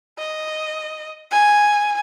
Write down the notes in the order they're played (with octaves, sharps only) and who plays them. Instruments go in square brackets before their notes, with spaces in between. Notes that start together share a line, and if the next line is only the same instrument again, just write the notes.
[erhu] D#5
G#5